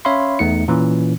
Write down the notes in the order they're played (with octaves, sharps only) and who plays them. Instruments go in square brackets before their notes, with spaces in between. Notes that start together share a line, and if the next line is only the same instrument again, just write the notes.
[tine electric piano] C#4 C#5 E5 F5 B5 C6
E2 A3 D#4 C#7
A#2 E3 C#4